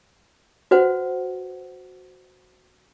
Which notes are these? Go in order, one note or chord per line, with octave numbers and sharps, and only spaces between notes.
F#4 B4 C5 F#5